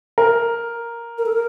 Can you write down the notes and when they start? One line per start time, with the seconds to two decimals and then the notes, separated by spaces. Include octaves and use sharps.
0.18 A#4
1.18 A#4
1.26 A4
1.33 A#4